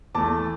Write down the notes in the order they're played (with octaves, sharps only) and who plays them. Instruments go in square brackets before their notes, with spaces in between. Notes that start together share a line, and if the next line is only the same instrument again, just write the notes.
[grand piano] E2 E3 A3 A5 D6